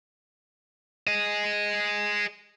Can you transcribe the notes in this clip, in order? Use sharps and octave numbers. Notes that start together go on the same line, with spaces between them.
G#4 D#5